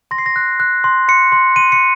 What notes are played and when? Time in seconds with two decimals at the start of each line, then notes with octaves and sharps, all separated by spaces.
0.11 C6 A#6
0.18 C7
0.26 A#6
0.36 F#6
0.60 F#6
0.84 C6
1.08 C6 C#7
1.32 C6
1.56 C6 D#7
1.72 C#7